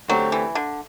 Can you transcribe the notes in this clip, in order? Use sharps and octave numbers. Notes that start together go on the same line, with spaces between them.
D3 F#3 A3 C4 G4
E3
D3